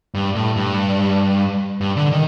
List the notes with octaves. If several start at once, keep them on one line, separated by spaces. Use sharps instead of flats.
G2
A2
G2
G2
D3
D#3